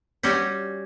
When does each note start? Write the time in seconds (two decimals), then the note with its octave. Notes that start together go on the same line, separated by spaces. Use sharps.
0.23 G3 C#4 F#4 G4